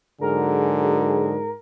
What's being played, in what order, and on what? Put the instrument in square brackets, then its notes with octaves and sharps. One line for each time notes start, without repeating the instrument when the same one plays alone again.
[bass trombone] G#2 [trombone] D3 [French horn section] F#3 F#4 G#4 [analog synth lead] A#4